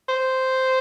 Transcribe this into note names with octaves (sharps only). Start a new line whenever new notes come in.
C5